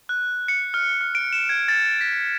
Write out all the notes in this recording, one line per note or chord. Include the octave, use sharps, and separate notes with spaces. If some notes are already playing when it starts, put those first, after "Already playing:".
F#6
C#7
F6
F6
D7
E7
G#6
A6
B6